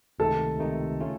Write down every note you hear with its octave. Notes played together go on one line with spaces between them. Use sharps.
C#2 C3 D#3 A3 D#4 A4
C#2 C3 D#3 A3 D#4
C#3 A3 C#4 F4